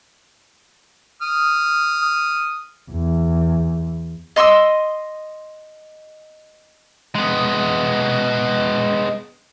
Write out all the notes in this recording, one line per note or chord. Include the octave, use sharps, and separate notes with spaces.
D#6 F6
E2
D#5 C6 C#6 E6
G#3 B3